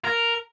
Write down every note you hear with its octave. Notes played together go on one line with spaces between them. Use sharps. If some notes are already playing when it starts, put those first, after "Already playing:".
A#4